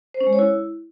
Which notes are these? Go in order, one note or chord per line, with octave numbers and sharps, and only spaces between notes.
C5
C#4
G#3
C#5
E4